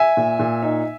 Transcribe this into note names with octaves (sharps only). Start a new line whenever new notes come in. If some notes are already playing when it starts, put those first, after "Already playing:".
Already playing: E5 G#5
A#2
A#2
D#4